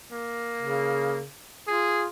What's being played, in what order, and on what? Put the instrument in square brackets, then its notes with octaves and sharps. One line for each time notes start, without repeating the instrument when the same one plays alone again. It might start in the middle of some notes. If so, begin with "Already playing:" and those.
[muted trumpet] A#3
[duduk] C#3
[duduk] F4 [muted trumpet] G#4